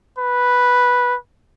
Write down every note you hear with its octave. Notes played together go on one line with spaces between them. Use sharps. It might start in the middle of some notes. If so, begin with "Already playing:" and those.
B4